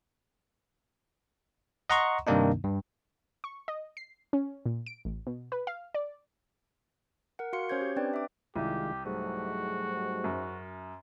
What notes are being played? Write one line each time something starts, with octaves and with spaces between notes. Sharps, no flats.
D#5 F#5 A#5 C6 C#6
G2 C3 D#3 A#3 D4 D#4
G2
C#6
D#5
C7
C#4
A#2
D7
A1
B2
B4
F5
D5
A#4 F#5
F#4 F5 C6 C#7
C#4 C5 C#5 G6 G#6
G4
C4 D4 B4 D5 G5
E5 D6
C2 D#3 G#3 F4 G4
G#2 F#3 G3 A3 F#4
F#2